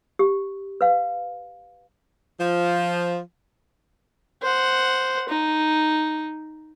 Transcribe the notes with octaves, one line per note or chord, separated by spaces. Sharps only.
G4
B4 F5
F3
C5 F#5
D#4